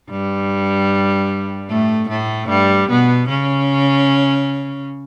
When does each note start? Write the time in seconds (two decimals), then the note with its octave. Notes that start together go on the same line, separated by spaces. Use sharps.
0.10 G2 G3
1.69 A2 A3
2.09 A2 A3
2.49 G2 G3
2.89 B2 B3
3.29 C#3 C#4